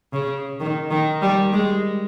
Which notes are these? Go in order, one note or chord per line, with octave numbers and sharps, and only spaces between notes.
C#3
D#3
D#3
G3
G#3